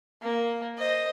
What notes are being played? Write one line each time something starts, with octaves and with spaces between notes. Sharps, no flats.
A#3
C5 D#5